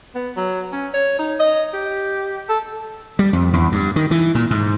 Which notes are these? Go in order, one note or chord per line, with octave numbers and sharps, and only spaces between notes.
B3
F#3
C#4
C#5
D#4
D#5
G4
A4
G3
F2
E2
G2
D#3
E3
A#2
G#2